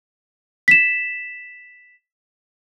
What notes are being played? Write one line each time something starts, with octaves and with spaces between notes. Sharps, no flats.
B6 E7